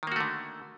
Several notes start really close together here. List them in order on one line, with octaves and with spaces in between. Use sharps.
D#3 A#3 F#4 A3 D3